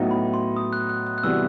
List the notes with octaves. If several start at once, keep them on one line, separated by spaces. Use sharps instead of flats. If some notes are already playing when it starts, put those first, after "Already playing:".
Already playing: A2 F#3 B3 D#4 F#4
B5
C6
D#6
F#6
F#6
F#6
F#6
C3 E3 G3 B3 F#4 E6